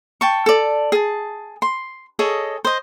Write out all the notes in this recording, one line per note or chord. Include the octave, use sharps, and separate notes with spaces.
G5 A5 C#6
A4 D5
G#4 A5
C6
G#4 A4 C#5 D#5
C5 D#5